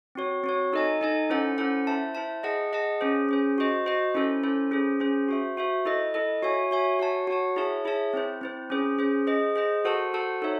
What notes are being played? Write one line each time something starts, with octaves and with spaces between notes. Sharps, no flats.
C4 F#4 C#5
C4 F#4 C#5
D#4 A4 D#5 G#5
D#4 A4 D#5 G#5
C#4 E4 A4 C5 F#5
C#4 E4 A4 C5 F#5
E4 C5 E5 A5
E4 C5 E5 A5
G#4 D#5 F#5 A5
G#4 D#5 F#5 A5
C#4 G#4 C5
C#4 G#4 C5
F#4 C5 D#5
F#4 C5 D#5
C#4 E4 A4 C5
C#4 E4 A4 C5
C#4 G#4 C5
C#4 G#4 C5
F#4 C5 E5
F#4 C5 E5
E4 A4 D#5
E4 A4 D#5
F#4 C#5 E5 G#5
F#4 C#5 E5 G#5
F#4 C#5 F#5 A5
F#4 C#5 F#5 A5
E4 G#4 C#5 E5 A5
E4 G#4 C#5 E5 A5
C4 E4 C5
C4 E4 C5
C#4 G#4 C5
C#4 G#4 C5
G#4 C5 D#5
G#4 C5 D#5
F#4 A4 C5 F#5 A5
F#4 A4 C5 F#5 A5
D#4 A4 C#5 E5